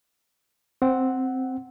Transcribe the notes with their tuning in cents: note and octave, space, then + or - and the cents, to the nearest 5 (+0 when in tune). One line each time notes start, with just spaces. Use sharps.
C4 +0 F#5 +5